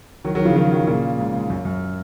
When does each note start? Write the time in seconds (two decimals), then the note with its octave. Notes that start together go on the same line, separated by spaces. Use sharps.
0.25 D#3 F#3
0.35 D#3 F#3
0.45 C#3 F3
0.56 D#3 F#3
0.71 D#3 F#3
0.87 A#2 C#3
1.19 G#2
1.34 G#2
1.50 F#2
1.65 F#2